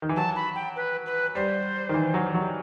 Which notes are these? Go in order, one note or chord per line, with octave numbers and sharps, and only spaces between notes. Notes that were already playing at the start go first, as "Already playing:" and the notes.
D#3
E3
F#3 A5
B5
G5
B4
B4
G3 C5
D#3
E3
F#3
F#3